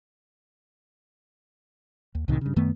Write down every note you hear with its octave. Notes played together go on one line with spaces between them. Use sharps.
D#2
C2 A2 C3 D#3
G2 C#3
F#2 D#3 A3 B3